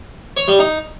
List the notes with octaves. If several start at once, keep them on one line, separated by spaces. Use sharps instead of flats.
C#5
G3
D#4